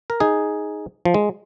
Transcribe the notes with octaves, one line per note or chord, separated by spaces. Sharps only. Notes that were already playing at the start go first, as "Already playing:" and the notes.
A#4
D#4 G#4
F3
G#3